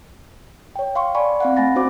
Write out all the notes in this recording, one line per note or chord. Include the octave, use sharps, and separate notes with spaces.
C#5 G5
F5 C6 C#6
D5 G#5 B5 C#6
C4 F5 F#5
A3 C4 G#5 B5 A6 A#6
C#4 D4 F#4 C5 D6